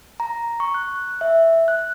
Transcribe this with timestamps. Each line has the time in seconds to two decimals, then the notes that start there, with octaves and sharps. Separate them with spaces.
0.20 A#5
0.60 C#6
0.74 F#6
1.21 E5
1.68 F#6